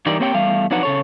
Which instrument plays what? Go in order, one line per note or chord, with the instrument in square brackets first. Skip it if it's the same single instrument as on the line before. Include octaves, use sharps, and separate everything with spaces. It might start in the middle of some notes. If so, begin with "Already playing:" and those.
[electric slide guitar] G2 E3 D#4 G4 A#4 D5
A#3 C4 G4 C#5 D#5 G5
E2 G3 A3 F5
F2 F#3 D4 D#4 B4 F#5
C#3 A4 C#5